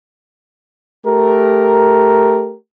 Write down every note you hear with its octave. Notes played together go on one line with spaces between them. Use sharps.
A3 G4 A#4